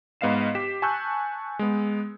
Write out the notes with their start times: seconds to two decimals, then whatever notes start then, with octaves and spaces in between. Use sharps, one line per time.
0.21 G#2 B3 D#5 F5 C7 E7
0.55 G4 B6 E7
0.82 G#5 A5 C#6 E6 F#6 G6
1.59 G#3 B3